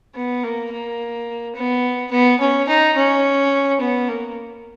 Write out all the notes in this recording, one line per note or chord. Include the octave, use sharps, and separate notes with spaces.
B3
A#3
A#3
B3
B3
C#4
D#4
C#4
B3
A#3